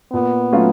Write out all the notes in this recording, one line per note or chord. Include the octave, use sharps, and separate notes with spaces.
A#2 B3
F#3 A3 C#4 F4